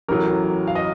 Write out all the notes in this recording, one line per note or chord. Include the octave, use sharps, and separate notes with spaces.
A1 A2 F#3 A#4
F5
D#5